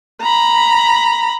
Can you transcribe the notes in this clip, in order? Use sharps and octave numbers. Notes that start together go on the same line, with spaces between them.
A#5 B5